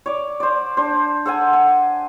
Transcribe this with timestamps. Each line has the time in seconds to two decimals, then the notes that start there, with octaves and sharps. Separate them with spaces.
0.06 C#5 D5
0.40 C5 D5
0.77 D4 C5
1.26 A4 C5 F#5 G#5
1.53 G#5